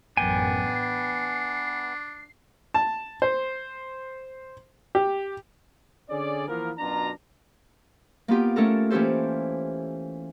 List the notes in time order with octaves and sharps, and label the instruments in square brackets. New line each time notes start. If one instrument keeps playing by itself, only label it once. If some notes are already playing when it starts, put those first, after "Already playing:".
[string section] A1 F#2 [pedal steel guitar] B3 G5 G#5 [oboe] D4
[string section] C7
[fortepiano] A5
C5
G4
[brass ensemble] D3 C#4 G#4 D5
E3 F3 A#3 B3 A#4
F#2 B2 D4 F4 A#5
[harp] A#3 B3 F4 G4
A3 C#4 A4 A#4
E3 A#3 C#4 G4 A4 C5